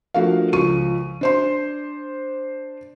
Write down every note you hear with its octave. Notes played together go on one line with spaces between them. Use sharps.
F3 A3 D4 F#4 A#4 F5
C#2 F3 C#6 D#7
D4 C5 C6